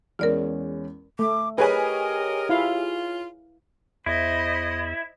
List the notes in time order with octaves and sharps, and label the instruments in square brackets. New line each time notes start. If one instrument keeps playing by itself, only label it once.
[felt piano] E2 G#3 C#4 [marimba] A#4 D5 F6
[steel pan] A3 [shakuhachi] D6
[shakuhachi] G4 [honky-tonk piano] G#4 C#5 G#5 [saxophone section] A#4 D#5 [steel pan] B4
[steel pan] E4 F5 [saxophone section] F4
[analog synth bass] E2 [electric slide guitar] E4 [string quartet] C5 D#5